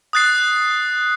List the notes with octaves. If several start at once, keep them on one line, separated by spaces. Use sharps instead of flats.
D#6 F#6 A6 C7